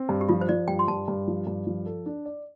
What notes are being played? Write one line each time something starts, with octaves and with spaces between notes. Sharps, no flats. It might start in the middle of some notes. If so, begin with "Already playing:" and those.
Already playing: C4
G2
G4
F3 F4
C5
F3 D5
G2 G5
C6
G2 A5
G2
F3
G2
F3
A4
D4
D5